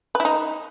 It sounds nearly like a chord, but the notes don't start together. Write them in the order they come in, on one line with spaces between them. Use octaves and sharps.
B4 E4 D#4